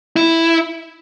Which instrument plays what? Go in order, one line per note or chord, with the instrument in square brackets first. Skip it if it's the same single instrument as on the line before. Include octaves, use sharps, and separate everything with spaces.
[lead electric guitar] E4